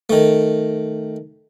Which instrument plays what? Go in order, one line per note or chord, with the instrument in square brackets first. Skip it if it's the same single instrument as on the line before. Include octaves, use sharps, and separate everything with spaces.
[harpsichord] D#3 A3